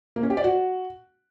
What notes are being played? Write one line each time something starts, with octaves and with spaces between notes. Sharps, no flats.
A#3
C#4
G4
D5
F#4